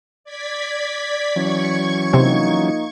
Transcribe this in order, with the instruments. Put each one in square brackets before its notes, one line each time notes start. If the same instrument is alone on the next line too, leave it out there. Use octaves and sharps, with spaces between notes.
[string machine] D5 G#6 B6
[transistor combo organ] E3 F#3 C#4 [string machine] C#6 G#6
[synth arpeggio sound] C3 C4 [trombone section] F3 A#3 D#4